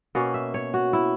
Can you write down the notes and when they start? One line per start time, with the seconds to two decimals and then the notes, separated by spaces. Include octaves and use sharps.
0.15 B2 A#3 C#4 F#5
0.34 E5
0.54 C#5
0.74 F#4
0.93 E4